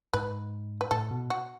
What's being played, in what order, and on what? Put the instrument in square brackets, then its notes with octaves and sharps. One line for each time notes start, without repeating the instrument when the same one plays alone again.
[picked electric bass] G#2 [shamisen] B4
[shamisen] B4
[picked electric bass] A2 [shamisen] A4
[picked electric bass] B2
[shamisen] F#4